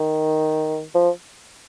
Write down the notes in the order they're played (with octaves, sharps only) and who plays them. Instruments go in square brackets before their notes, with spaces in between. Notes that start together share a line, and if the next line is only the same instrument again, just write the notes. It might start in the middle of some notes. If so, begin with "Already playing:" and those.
Already playing: [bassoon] D#3
F3